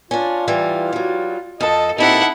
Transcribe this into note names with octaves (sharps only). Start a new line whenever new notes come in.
C#4 D4 F4
E3 G3
F#3 G3
F2 A4 D#5 A5
A#2 C4 D#4 E4 G4 A4 F#5